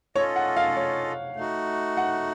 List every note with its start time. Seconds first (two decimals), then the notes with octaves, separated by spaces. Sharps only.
0.16 C#4 F4 A4 C#5 D#5
0.36 F#5
0.56 F5
0.77 C#5
1.36 A3 D#4 F#4
1.97 F#5